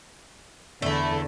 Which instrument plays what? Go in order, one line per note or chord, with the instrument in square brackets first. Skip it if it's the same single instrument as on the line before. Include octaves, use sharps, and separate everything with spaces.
[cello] E2 D3 [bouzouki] A3 E4